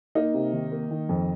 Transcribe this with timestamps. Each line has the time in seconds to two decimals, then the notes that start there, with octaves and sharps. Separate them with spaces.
0.15 A#3 D#4
0.34 C3
0.53 D#3
0.72 A#3
0.91 D#3
1.09 F2